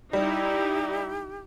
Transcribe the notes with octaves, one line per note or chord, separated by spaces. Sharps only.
G3 D#4 E4 G4